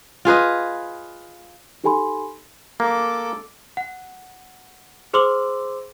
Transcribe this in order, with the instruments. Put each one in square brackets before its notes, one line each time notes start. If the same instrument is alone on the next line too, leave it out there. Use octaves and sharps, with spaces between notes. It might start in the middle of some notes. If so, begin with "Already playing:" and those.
[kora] F4 G#4 B4 D#5
[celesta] D#4 G4 A4 G#5 B5 C6
[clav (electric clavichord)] A#3 [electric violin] A4 D6
[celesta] F#5
G#4 C5 C6 D6 E6 F#7